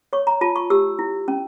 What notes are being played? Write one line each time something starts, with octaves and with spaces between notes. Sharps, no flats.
C#5 C#6
A#5
F4 A5
C#6
G4 E6
E4
C#4